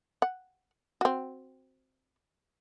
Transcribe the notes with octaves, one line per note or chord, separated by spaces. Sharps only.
F#5
C4 F#4